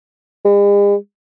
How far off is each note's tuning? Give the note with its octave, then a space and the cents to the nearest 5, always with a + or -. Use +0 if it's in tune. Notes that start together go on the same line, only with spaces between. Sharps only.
G#3 -45